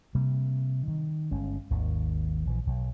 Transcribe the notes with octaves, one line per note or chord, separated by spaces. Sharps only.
C3 G3 A#3
D#3
G1 G#3 C#4
G#1 D#2 D#3
A#1 E3
B1